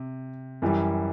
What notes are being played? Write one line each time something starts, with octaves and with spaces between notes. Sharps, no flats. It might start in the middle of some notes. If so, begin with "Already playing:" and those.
Already playing: C3
F#2 E3 G3